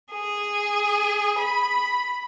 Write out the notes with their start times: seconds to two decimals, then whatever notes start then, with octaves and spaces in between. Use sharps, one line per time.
0.12 G#4
1.39 B5